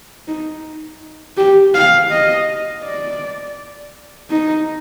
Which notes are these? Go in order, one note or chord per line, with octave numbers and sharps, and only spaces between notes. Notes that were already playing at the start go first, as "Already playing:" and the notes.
D#4
G4
F5
D#5
D5
D#4